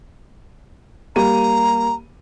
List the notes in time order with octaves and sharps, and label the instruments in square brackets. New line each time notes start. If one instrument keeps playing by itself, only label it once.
[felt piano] G3 A#3 D#7 [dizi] A#5